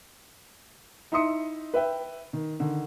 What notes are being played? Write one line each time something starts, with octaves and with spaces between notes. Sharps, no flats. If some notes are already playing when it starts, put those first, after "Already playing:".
D#4 E4 E5 C6 D#6 C#7
B4 E5 G5
D#3
D3 D#3